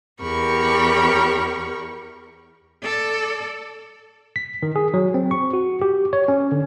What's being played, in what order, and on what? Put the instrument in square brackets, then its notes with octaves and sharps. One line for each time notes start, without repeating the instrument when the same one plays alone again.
[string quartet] E2 G4 A#4 B5 C#6
[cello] A4 D5
[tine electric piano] B6
D#3
G#4
F#3
C4
C#6
F#4
G4
C#5
C#4
D3